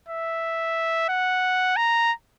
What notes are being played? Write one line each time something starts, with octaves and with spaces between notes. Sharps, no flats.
E5
F#5
A#5